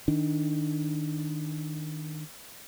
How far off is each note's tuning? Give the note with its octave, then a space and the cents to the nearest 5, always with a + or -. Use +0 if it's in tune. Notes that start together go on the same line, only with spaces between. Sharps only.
D#3 +0 D4 +0